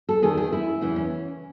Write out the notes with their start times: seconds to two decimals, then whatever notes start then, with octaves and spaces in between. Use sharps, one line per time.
0.09 A4
0.22 E2 D#3 G#4
0.37 G#4
0.52 E4
0.81 E2 C#3 E3 E4
0.96 C#4